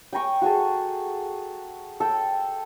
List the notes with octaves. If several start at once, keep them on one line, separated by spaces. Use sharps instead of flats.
G5 G#5 A#5 C#6
F#4 G#4 A4
A4 G5